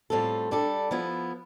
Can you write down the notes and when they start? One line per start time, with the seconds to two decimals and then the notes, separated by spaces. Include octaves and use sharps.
0.10 A2 G3 C4 F4 A4
0.51 G3 D4 A4
0.91 F3 B3 E4